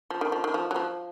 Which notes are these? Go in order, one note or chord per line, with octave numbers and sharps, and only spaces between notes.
F3
D#3
F3
D#3
F3
F#3
F3